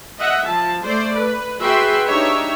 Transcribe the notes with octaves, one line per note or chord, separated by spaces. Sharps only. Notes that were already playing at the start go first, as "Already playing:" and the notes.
D#5 E5 F#5
F3 A5
A3 C5 D5
B4
F#4 G#4 B4 E5 G5 C6
D4 D#4 G4 C#5 E5